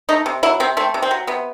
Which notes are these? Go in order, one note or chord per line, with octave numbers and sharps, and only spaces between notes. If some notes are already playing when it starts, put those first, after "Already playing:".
A3 D#4
C3
F#3 E4
C3 C4
A3 C4
C3
C4
F#3
C3 B3